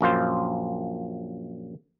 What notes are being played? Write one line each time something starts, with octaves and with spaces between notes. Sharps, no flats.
A#1 F#2 F4 C5